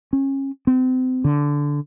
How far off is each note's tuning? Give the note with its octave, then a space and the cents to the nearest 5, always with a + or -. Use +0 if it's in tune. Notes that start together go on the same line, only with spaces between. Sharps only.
C#4 -25
C4 -35
D3 -10